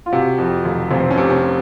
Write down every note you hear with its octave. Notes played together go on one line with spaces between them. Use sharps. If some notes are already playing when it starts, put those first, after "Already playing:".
F4
C3 F#4
F2
F1
F1 C4
C#4
C3
C#4